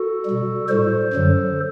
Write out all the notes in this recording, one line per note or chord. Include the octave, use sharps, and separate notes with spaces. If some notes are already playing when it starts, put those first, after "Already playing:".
Already playing: F#4 A4
B2 G3
A2 G3 A4 C5
F#2 D3 F#3